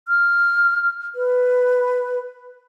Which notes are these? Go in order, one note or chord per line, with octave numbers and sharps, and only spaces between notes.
F6
B4